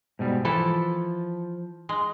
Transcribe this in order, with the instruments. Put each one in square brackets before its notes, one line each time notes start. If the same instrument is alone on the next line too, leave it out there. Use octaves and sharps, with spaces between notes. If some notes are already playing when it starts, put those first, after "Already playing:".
[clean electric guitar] G#2 B2 G3
[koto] E3 E4 A4 [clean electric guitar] F3
[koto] G#3